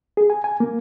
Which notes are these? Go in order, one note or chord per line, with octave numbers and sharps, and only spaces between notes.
G#4
G#5
G#5
A#3